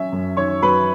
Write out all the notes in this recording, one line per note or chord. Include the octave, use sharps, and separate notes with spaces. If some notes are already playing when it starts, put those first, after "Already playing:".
Already playing: F#3 C#4 E5 E6
F#2
D#3 C#5 C#6
F#3 B4 B5